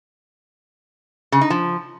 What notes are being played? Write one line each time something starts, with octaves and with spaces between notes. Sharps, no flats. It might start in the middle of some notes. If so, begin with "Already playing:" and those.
C#3
D#4
F3